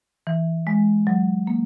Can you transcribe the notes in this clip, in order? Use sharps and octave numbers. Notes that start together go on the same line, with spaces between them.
E3
G#3
F#3
A#3